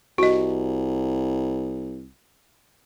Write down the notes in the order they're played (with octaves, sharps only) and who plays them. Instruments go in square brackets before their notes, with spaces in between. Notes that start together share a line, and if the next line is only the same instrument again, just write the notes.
[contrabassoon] C2 [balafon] F#4 D#5